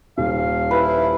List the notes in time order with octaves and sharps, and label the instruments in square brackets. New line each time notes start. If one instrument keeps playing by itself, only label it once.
[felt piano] D#1 [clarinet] F5
[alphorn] E4 [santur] B4